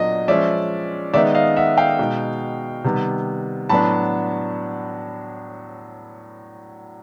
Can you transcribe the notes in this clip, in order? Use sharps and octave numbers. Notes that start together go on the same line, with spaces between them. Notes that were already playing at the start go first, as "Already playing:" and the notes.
Already playing: A#2 F#3 B3 D4 D#5
F3 G#3 C#4 D5 E5
D#3 G#3 B3 D#4 D5 E5
D#5 F5
E5 F#5
F5 G5
B2 G#3 B3 D#4
C3 D#3 G3 B3
A2 F#3 B3 D4 A5 B5